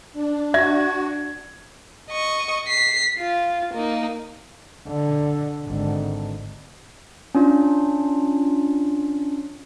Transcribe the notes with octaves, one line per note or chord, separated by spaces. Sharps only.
D4
F#4 E5 G#6
D#5 C#6
B6 C7
F4
A#3 D#4
D3
G#1 D3
C#4 D4 F4